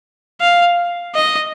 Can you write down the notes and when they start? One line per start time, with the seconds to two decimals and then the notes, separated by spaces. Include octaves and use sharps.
0.41 F5
1.15 D#5